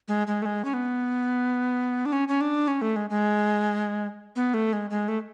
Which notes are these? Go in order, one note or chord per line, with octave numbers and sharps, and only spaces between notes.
G#3
G#3
A3
G#3
C#4
B3
D4
C#4
C#4
D4
C#4
A3
G#3
G#3
B3
A3
G#3
G#3
A3